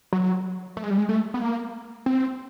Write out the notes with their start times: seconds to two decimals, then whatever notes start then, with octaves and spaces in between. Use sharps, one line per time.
0.13 F#3
0.77 A3
0.83 G#3
0.90 G3
0.98 G#3
1.09 A3
1.34 B3
1.42 A#3
2.06 C4